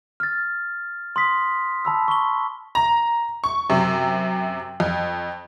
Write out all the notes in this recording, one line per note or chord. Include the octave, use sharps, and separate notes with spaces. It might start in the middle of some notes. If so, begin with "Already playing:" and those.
F6 A6
C6 D#6 B6
A5 B5 E6
C#6 G7
A#5
C#6
F#2 C3
F2